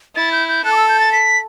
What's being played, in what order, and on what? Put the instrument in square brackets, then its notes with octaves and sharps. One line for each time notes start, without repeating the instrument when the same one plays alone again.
[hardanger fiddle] E4 [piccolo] A6
[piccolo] G6
G6
[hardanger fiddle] A4 [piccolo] F#6
[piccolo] D6
E6
G6
A6
B6